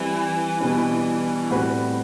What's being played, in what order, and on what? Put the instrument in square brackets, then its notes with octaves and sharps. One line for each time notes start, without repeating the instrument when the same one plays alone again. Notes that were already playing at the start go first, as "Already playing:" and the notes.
Already playing: [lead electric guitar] E3 [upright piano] G3 C4 E4 B4
[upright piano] B2 G3 D4
A2 G3 C4 F#4 B4